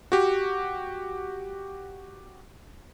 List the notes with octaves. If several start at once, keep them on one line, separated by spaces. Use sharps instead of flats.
F#4 G4